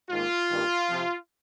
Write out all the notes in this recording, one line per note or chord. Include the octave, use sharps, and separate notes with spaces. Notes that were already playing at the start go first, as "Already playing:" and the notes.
G#2 D#3 A#3 F4
G2 D#3 G3 A#3
C3 F3 C4